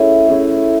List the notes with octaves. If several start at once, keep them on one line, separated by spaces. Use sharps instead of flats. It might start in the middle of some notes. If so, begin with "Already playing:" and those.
Already playing: A3 C#4 E4 G#4
A3 C#4 E4 G#4